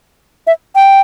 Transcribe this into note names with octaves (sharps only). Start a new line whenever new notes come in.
E5
G5